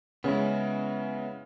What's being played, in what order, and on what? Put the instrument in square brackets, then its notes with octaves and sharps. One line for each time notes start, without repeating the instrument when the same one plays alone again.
[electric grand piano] C#3 G#3 [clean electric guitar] B3 C#4 E4